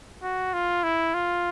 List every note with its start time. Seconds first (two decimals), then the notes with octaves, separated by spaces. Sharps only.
0.23 F#4
0.53 F4
0.83 E4
1.14 F4